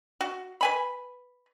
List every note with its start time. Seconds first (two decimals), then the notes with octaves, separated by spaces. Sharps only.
0.21 F#4
0.61 B4 G#5 B5